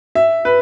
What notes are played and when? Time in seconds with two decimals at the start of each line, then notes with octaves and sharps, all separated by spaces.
0.15 E5
0.45 B4